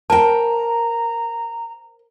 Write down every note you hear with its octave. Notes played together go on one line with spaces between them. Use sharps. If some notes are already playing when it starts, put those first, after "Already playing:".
A#4 C5 G5 A5 A#5